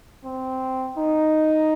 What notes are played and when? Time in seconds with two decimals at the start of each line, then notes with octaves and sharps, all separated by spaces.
0.25 C4
0.98 D#4